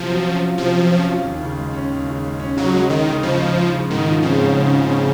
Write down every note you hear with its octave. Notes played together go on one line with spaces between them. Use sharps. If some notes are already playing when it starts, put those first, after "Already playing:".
Already playing: C3 F3
F#3
C#4
F4
C3 F3
F#3
C#4
F4
D#2
C#3
G#3
C#4
D#2
C#3
G#3
C#4
C#3 F#3
G#3
D#3 D#4
C#3
C#3 F3
G#3
D#4
C#3
G#2 D#3
F3
C#3 C4
G#2
G#2
F3
C4